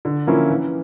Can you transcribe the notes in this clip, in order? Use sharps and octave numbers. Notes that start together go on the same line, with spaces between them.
D3
F3 A#3 C#4 E4
E3